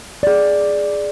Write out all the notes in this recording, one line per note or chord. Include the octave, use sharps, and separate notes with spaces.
G#4 D5